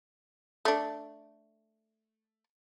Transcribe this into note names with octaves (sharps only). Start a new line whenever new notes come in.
A3 D4